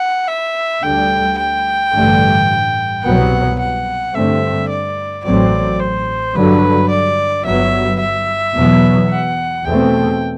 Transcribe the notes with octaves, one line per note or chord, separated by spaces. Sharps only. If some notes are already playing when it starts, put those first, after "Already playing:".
Already playing: F#5
E5
D2 D3 G3 G5
G5
A1 G2 D3 A3
C2 B2 F#3 B3 F#5
F#5
G2 D3 A3 C4 E5
D5
A1 A2 F#3 C4 D5
C5
G2 D3 F#3 B4
D5
G1 G2 F#3 B3 E5
E5
E2 B2 F#3 B3
F#5
E2 B2 A3 C4 G5